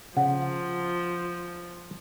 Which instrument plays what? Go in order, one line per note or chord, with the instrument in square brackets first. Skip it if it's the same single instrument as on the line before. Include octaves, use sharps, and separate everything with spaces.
[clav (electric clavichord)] C#3 [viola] F3 [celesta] F#5